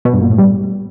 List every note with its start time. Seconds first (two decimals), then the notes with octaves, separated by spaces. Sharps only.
0.05 B2
0.13 G2
0.22 A#2
0.30 A2
0.38 G3